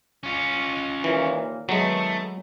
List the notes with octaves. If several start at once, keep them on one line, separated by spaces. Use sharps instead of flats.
C#4 F4
D#2 A#2 E3 A#3
D#3 F#3 G#3 A3 B3